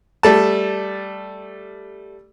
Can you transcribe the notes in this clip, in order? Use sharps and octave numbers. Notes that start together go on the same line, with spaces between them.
G3 A3 A5